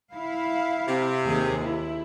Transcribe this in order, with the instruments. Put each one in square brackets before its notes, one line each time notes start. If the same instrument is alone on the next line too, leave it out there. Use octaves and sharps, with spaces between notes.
[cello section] E4 F5
[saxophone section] C3
[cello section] D#2 G#4
E4